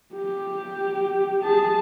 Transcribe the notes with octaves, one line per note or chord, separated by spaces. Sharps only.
G4
G#4 A5